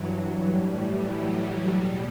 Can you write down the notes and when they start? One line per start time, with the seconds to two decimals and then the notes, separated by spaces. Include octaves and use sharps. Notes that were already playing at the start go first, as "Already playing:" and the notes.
Already playing: G2 E3 F#3
0.44 A2 E3 G3
1.08 F#3
1.72 E2 B2 G3